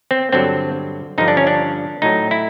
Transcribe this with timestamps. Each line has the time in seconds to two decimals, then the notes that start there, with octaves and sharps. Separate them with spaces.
0.11 C4
0.33 G2 D3 F#3 C4
1.18 G2 D3 F3 D#4
1.28 D4
1.37 C#4
1.47 D4
2.02 A2 F#3 D#4
2.31 E4